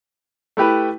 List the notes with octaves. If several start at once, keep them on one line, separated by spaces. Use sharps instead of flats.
A3 E4 G4 B4